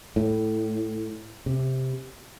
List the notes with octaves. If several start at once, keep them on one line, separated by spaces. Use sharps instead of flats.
A2
C3